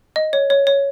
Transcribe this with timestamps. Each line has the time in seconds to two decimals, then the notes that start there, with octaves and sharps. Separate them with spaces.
0.16 D#5
0.33 C#5
0.50 C#5
0.67 C#5